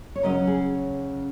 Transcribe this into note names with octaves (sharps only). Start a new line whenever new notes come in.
C#5
C#3 F#3 C#4 A#4 D#5
G#4